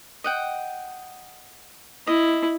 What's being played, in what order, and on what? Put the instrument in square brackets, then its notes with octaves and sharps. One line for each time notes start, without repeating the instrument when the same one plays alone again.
[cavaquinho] D#5 F#5 G5
[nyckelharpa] E4 [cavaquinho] D#5